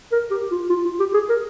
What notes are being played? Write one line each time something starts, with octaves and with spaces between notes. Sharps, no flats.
A#4
G4
F4
F4
F4
G4
G#4
A#4